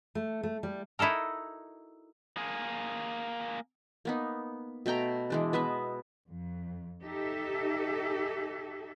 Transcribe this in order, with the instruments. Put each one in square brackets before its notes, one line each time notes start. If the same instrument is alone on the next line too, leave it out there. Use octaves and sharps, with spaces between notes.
[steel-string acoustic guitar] A3
A3
G3
[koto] D#4 E4 F#4 A4 A#4
[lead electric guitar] A#3 G#4
[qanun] A#3 B3 D#4
B2 A3 G5 A#5
E3 G#3 D4
B3 B4 D#5 E5
[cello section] F2
D#4 G4 A4 E5